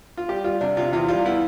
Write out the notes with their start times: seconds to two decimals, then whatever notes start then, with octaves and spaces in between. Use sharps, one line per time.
0.17 F4
0.28 G3 G4
0.44 G3 F4
0.61 C3 D4
0.77 C3 F4
0.93 E2 F4
1.08 G3 F4
1.25 B3 E4